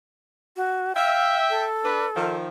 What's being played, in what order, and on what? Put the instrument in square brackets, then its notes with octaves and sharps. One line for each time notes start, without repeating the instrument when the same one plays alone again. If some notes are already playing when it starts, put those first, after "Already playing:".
[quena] F#4
[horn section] E5 G5 [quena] F5
[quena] A4
[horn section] D4 B4
D#3 F3